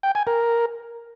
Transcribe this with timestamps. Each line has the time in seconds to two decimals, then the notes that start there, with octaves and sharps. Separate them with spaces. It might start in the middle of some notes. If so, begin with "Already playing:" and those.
0.03 G5
0.15 G#5
0.27 A#4